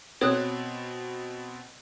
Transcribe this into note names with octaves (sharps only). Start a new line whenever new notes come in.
B2 C4 C#5 D#6 F#6